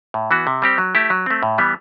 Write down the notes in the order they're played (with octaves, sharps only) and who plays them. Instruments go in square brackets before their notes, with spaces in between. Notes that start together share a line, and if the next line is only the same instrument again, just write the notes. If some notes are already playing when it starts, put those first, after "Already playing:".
[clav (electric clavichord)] A2
E3 B3 F#4
C3
G3 C4 G4
F#3
A3 E4 G4
F#3
A3 C4
A2
E3 G3 B3